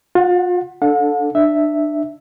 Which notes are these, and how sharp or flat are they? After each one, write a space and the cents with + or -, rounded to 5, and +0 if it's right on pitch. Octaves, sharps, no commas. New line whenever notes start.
F4 +35 F#5 +0
D4 +0 A4 +0 F#5 -45
D4 +25 E5 +0